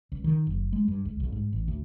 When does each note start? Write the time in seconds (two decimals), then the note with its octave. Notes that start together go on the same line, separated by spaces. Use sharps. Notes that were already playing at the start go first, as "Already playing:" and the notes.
0.12 C#2
0.24 D#3
0.47 F#1
0.73 G#3
0.88 G2
1.05 C#2
1.20 B1
1.32 G#2
1.53 A1
1.68 D2